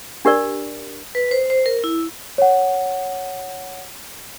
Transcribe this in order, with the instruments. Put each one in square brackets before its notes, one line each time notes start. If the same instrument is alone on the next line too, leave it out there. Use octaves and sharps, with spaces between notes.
[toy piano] D4 G4 A#4 D5
[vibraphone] B4
C5
C5
A#4
E4
[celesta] C#5 F#5